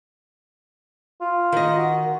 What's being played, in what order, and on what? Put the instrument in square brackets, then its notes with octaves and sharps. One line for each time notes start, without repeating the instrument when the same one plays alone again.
[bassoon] F4
[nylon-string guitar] D#3 D#5
[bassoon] F#4